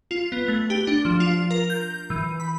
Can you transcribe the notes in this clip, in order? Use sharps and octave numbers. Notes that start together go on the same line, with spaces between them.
F4
B3
A3
G4
D4
F3
F4
A#4
G6
E3
B5